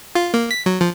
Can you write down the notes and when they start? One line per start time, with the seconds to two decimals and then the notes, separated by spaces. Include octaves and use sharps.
0.15 F4
0.34 A#3
0.51 B6
0.66 F#3
0.81 F3